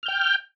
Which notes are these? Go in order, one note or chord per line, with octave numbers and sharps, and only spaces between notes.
G5 F6 G6